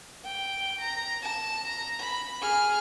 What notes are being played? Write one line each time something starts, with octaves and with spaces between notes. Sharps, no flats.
G5
A#5
A5
A#5
B5
G#4 F6